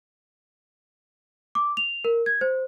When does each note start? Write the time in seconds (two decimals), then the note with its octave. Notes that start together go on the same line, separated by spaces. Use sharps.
1.55 D6
1.77 F7
2.05 A#4
2.26 G#6
2.41 C5